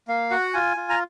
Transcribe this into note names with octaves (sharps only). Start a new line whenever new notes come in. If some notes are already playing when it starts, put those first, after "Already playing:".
A#3 F5
F#4 F#5
F4 G#5
F4
A#5